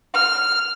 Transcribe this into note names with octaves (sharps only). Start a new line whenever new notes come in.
F6